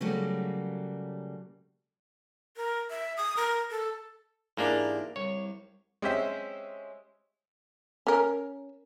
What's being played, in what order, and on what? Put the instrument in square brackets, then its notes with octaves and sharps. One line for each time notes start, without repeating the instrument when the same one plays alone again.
[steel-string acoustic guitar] C#3 F#3 G3 A3 A#3
[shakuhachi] A#4
E5
D#6
A#4
A4
[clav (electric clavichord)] G#2 A#3 D4 [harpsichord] E3 G4 A#4
[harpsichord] C2 [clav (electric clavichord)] C#5
[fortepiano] G#3 C4 C#4 G4 C5 E5
[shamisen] C#4 A#4